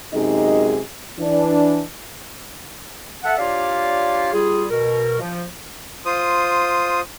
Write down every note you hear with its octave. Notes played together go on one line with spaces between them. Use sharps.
F#2 C3 G#3 D#4 G#4 D#5
E3 D4
A4 E5 F#5
D4 F4 G4 C#5 D5 F5
G3 F4 G#4
B2 A#4
F3
F4 C5 D#6